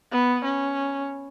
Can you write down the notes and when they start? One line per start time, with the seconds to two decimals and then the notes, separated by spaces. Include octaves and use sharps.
0.12 B3
0.45 C#4